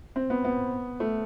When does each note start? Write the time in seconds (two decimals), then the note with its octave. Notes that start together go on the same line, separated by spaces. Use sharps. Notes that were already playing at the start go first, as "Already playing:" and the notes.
0.16 C4
0.30 B3
0.45 B3
1.00 A3